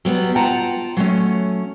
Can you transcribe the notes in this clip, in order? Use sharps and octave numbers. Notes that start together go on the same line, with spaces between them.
F#3 G3 B3
F4 F#5 G5 A5 A#5
F#3 A3 C#4